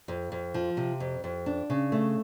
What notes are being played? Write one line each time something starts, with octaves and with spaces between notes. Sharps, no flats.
F2
F2
F3
C3
F2
F2
D4
C#3
A3